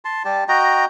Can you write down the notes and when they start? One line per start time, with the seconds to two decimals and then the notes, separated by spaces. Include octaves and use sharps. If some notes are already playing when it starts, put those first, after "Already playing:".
0.05 A5 C6
0.25 G3 G4 A5
0.49 F#4 D#5 G5 A#5